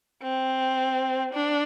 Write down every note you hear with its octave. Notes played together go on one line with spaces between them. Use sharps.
C4
D4